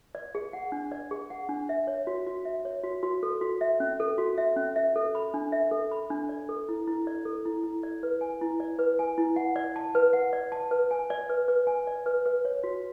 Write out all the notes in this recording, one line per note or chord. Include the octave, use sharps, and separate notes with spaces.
D5
G#4
F#5
D4
D5
G#4
F#5
D4
E5
C#5
F#4
F#4
E5
C#5
F#4
F#4
A4
F#4
E5
C#4
A4
F#4
E5
C#4
E5
A4
B5
D4
E5
A4
B5
D4
D5
A4
E4
E4
D5
A4
E4
E4
D5
B4
G#5
E4
D5
B4
G#5
E4
F#5
D5
A5
B4
F#5
D5
A5
B4
G#5
D5
B4
B4
G#5
D5
B4
B4
C#5
F#4